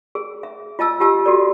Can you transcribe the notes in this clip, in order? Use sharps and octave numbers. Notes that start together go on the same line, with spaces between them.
G#4
E5
F4 D#5 A5 E6
F4 G4 A5 E6
F#4 G4 A4 D5